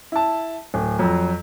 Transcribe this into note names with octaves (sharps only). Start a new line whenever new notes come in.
E4 A5
D1
F2 F#3